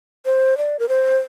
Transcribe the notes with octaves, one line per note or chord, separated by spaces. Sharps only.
C5
D5
A#4
C5